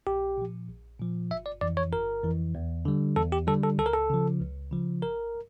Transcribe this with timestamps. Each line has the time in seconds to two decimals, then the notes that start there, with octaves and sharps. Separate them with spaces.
0.07 A#1 G4
0.38 A#2 F3
0.69 A#1
0.99 A#2 F3
1.31 G1 E5
1.46 D5
1.61 F2 E3 D5
1.77 C#5
1.92 G1 A#4
2.24 F2 E3
2.55 E2
2.85 D3 G3
3.16 E2 A4
3.32 G4
3.47 D3 G3 A4
3.64 A4
3.78 C#2 A4
3.86 A#4
3.94 A4
4.10 C#3 F3
4.40 C#2
4.71 C#3 F3
5.02 A1 A#4